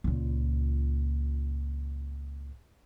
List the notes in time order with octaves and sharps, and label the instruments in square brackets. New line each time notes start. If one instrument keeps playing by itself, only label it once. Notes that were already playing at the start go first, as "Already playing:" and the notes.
[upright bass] C#2 A#2